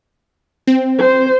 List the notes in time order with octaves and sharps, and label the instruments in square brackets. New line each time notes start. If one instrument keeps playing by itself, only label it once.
[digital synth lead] C4
[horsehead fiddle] C5